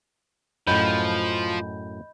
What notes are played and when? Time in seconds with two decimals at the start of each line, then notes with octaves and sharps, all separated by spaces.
0.67 F#2 A2 F3 D#5 B5 G6